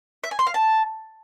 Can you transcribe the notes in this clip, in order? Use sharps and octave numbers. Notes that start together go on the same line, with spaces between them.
E5
G#5
C6
F5
A5